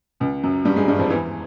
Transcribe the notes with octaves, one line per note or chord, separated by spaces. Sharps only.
C#2 C#3
F#2 F#3
G2 G3
G#2 G#3
G2 G3
F2 F3
E2 E3